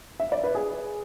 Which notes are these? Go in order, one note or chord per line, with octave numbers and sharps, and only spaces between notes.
E5
D5
B4
G#4